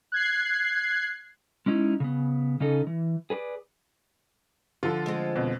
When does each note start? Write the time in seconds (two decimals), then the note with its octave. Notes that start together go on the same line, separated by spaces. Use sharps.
0.12 F#6 G#6 C7
1.66 G#3 C#4 D#4 E4
2.00 C#3 B3
2.60 C#3 C#4 D#4 A4
2.87 E3
3.30 G#4 B4 C#5 D5
4.83 D3 F3 F4 A4
5.06 G#3 C4
5.36 F2 B2